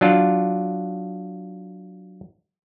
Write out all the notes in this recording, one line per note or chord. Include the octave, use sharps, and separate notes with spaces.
F#3 D4 F4